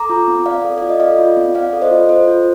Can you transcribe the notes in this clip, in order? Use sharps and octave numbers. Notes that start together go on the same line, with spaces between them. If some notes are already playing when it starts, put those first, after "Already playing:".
Already playing: A4 A#5 D6
F4
C4
C4 D5 F5
A4
F4 D5
D#5
A4 D5 F5
F4
C4
C4 D5 F5
A4
C5 D#5
F4
A4 C5
F4